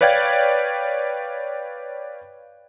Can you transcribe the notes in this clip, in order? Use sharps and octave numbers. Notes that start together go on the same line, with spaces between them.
B4 C#5 D5 F5 G5 G#6